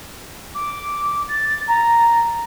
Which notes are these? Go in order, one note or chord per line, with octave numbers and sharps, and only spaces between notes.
D6
A6
A#5